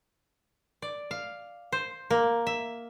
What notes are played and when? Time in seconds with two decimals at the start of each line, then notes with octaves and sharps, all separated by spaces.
0.82 D5
1.11 F5
1.72 C5
2.10 A#3
2.47 E5